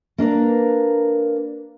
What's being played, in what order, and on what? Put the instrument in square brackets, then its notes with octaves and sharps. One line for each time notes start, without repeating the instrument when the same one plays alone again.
[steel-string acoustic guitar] A#3 D4 A#4 B4